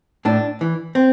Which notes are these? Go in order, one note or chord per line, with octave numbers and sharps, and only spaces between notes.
A2 D4
E3
C4